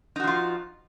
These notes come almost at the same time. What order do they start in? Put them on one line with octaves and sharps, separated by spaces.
D#4 F#4 F3 F4